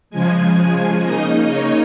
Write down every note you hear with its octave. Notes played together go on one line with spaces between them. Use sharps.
C#3 F3 G#3 G#5
G#5
C#3 A#3 D#4 D#5
C#5